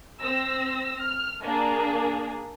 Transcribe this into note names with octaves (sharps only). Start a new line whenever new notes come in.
C4 E6 A#6
F6
A#3 D4 G#4